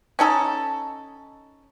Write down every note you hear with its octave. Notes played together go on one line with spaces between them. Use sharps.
C#4 D#4 A4